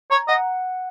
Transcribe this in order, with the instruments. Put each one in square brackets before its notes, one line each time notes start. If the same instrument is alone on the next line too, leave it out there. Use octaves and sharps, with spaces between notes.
[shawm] C#5 [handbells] A#5
[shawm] D#5 [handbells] F#5